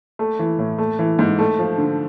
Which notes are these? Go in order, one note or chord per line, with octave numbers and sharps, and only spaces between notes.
A3
E3
A2
A3
E3
G#2
A3
F3
D3